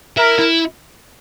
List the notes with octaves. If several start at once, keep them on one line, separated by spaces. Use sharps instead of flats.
E4 A#4
E4